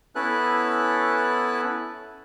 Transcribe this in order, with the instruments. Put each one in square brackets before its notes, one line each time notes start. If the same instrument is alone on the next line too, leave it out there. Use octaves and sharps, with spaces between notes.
[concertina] B3 C#4 E4 A4 B4 F#6